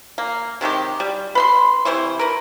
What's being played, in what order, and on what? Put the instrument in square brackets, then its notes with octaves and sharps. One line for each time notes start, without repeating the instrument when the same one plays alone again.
[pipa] A#3
C3 D#3 G#3 G4
G3
B4 B5 C6
C3 E3 C5 C#6
A#4 B4